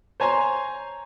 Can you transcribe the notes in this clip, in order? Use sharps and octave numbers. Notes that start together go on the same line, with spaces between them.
C5 C#5 G#5 A#5 C6